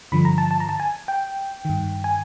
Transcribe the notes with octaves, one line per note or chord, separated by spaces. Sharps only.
G2 D3 F3 B5
A#5
A5
A5
A#5
A5
G#5
G5
G2 D#3
G#5